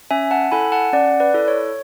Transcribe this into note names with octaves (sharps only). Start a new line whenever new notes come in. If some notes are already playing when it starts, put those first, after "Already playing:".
C#4 E5 G#5
F#5 A5
E4 A4 G#5 B5
F#5 A5
C#4 D5 F#5
B4 D5
E4 A4
C#5